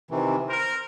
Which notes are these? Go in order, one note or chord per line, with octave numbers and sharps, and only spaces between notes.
C3 D#3 E3
A#4 C5